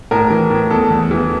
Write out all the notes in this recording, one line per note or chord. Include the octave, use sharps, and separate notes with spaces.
A2 A#4
E3
A2
E2 A4
E2
E3